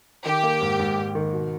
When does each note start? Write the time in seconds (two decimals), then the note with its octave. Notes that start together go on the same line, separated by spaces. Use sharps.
0.25 D#3 G4
0.43 A#3
0.61 G#2
0.79 G#2
0.98 G#2
1.15 D#3
1.33 B2